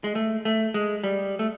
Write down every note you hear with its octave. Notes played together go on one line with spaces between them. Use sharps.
G#3
A3
A3
G#3
G3
A3